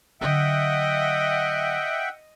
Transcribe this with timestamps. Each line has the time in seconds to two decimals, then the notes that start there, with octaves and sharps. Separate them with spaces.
0.21 D3 F#3 D#5 E5 F#5 G5